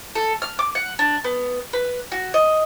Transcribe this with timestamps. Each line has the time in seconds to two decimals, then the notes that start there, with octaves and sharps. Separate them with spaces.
0.15 A4
0.42 F6
0.59 D6
0.75 F#5
0.99 D4
1.24 B3
1.73 B4
2.12 F#4
2.34 D#5